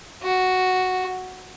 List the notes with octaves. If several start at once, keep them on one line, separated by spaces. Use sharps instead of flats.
F#4